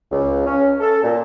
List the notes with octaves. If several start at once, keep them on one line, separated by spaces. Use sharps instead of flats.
C#2
C#4
A4
A#2